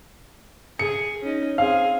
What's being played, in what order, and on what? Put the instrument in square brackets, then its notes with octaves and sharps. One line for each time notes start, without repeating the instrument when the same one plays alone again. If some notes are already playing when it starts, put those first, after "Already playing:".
[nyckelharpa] G#4 [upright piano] C#7
[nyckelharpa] C#4 D#4
[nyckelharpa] C4 G#4 [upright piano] F5